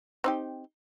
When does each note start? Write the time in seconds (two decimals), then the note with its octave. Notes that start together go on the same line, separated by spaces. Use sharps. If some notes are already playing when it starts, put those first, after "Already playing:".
0.24 C4 D#4 G4